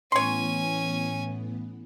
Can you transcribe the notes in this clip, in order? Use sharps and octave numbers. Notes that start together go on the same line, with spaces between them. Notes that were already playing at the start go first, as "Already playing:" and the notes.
A2 E3 B3 C#4 C#5 G#5 C6